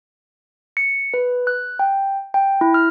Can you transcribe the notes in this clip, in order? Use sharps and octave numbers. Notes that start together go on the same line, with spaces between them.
C#7
B4
F#6
G5
G5
E4
F6